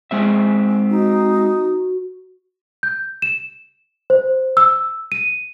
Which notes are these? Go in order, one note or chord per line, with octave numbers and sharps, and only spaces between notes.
G#3 C4 E5
D#4 F#4
G6
E7
C5
E6
D#7